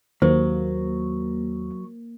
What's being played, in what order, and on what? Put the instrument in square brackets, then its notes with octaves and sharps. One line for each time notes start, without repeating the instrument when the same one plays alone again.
[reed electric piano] D#2 [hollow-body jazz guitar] F#3 [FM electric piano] A#3 [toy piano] C5